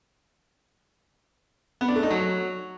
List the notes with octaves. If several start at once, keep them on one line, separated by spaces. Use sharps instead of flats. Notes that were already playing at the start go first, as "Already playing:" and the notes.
B3
D4
A3
D#4
F#3